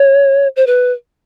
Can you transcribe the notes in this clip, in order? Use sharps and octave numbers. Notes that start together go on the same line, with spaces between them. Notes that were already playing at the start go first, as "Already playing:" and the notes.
Already playing: C#5
C5
B4